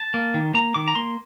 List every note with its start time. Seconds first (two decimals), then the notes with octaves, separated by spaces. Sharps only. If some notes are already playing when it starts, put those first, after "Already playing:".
Already playing: A5
0.14 A#3
0.34 D#3
0.54 A#3 A#5
0.74 D#3 D6
0.88 A#5
0.95 A#3 C6